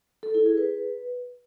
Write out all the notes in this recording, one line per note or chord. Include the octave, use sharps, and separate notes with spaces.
A4
E4
G#4
B4